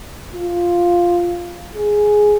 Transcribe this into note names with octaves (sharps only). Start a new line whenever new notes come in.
F4
G#4